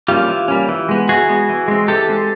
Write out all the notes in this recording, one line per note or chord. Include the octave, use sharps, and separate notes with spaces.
G3 A#3 C#4 F4 G4
E3
G3 A#3 C#4
E3
G#3 B3
E3 F#4 G#4
G#3 B3
E3
G#3 C4
E3 G4 A4
G#3 C4